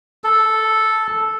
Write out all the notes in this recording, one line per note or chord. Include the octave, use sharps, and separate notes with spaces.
A4